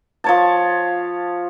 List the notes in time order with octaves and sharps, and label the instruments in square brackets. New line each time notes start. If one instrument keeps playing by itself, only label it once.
[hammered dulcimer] F3 C#5 A5